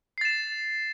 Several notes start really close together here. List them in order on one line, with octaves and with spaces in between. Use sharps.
C7 A6 E7